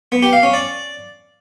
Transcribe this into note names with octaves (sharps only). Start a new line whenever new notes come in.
B3
G4
F5
C#4
D5